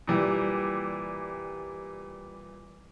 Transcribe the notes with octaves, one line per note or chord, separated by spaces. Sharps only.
A#2 E3 G3